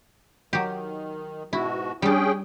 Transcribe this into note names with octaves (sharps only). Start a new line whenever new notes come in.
D#3 F#3 G4
G#2 B2 E4 F#4
G3 C#4 D4 G#4 G5